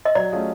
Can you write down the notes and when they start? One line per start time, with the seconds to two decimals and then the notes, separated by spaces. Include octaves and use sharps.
0.05 D#5
0.15 F#3 D5
0.32 A3 C#4 F4 G#4